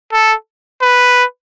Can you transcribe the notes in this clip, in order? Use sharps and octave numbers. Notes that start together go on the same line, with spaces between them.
A4
B4